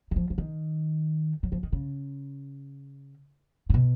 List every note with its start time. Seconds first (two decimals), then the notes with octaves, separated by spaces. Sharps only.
0.11 D#3
0.16 F3
0.30 F3
0.38 D#3
1.43 F#3
1.52 F3
1.63 D#3
1.72 C#3
3.70 A#2
3.74 B2